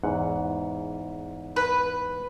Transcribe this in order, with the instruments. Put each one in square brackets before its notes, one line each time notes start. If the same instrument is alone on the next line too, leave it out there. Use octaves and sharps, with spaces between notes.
[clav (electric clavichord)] E2 G#2 F#5
[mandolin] B4